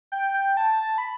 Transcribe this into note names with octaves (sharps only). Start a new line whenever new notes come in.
G5
G5
A5
B5